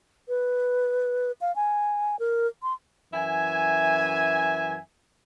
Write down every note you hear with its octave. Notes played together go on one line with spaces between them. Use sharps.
B4
F5
G#5
A#4
C6
F#2 E3 E5 G#5